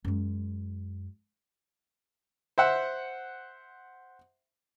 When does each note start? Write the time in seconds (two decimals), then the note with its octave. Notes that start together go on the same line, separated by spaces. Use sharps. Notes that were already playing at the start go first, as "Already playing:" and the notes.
0.05 F#2 G#3
2.58 C5 E5 F#5